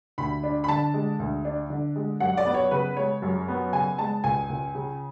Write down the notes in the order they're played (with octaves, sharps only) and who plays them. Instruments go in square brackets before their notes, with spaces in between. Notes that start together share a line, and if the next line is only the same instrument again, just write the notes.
[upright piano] D2 B5
D4
B5
D3 A5
G#3
D2
D4
D3
G#3
F#2 F#5
D5
B3
C#5
C#3 B4
G#3 C#5
F#2
B3
C#3 G#5
G#3 A5
C#2 G#5
C#2
C#3